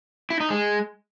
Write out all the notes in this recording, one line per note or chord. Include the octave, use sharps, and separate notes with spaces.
E4
D#4
G#3